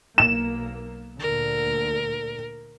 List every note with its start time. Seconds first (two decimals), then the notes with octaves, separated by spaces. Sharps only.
0.18 B1 A#3 E7
1.20 D2 A#2 D3 A#4